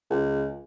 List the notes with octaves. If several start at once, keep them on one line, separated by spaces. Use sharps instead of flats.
C#2